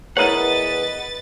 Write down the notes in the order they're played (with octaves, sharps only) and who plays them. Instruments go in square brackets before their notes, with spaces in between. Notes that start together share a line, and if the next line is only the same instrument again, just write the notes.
[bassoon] E2 [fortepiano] E4 A#4 C#5 [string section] B4 A6 [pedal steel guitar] D#5 F#5